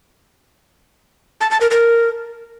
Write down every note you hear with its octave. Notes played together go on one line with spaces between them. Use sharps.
A5
A5
A#4
A#4